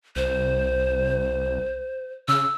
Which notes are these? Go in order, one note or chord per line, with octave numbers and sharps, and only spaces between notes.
C2 C5
C#3 E6